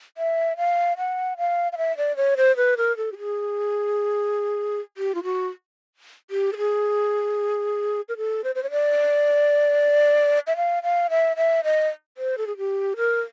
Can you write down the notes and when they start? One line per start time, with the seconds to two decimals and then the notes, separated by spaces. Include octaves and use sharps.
0.18 E5
0.57 F5
0.98 F#5
1.38 F5
1.72 F5
1.78 E5
1.97 D5
2.17 C#5
2.37 C5
2.57 B4
2.77 A#4
2.97 A4
3.12 G4
3.18 G#4
4.97 G4
5.15 F4
5.23 F#4
6.31 G4
6.53 A4
6.57 G#4
8.09 A#4
8.17 A4
8.44 C5
8.55 C5
8.63 C#5
8.71 D5
10.47 E5
10.56 F5
10.83 F5
11.10 E5
11.37 E5
11.64 D#5
12.18 C5
12.38 A4
12.47 G#4
12.58 G4
12.97 A#4